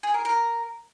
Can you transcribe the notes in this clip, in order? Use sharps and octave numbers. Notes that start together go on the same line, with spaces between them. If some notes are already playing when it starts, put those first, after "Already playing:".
G#4
A#4
A#4